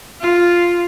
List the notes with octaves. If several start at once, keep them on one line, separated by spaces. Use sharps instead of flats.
F4